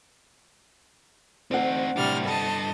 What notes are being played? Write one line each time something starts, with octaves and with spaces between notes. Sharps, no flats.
D2 C4 D#4 F#5
A2 C3 G3 D4 F6
G2 A4 D#5 A5